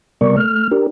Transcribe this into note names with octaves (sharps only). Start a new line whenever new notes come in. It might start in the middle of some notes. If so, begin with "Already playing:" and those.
C3 G3 B3 A#4 D5 C#6
A3 F6
D4 G4 A#4